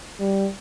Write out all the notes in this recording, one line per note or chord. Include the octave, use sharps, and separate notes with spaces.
G3